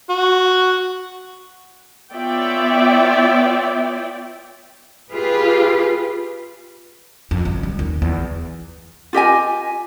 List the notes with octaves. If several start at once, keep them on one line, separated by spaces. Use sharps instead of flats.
F#4
B3 F4 C#5 D5 E5 G5
F4 G4 G#4 B4
F2
G1
G3
D#2
E2
F4 G4 D#5 G#5